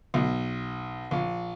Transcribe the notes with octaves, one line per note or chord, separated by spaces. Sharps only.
B1
A#1